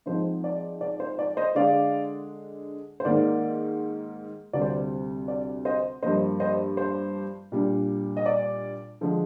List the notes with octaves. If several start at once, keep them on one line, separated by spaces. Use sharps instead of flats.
G#2 F3 C4 D#4 C5
D5
D5
C5
D5
C5 D#5
D3 G#3 D4 D5 F5
C5
G#2 D#3 A#3 D5
D2 C3 G3 C4 D5
C5
C5
D5
C5 D#5
G2 F3 A#3 C5 D#5
C5 D#5
C5
A#2 G3 D4
D#5
D5
D3 F3 G#3 D4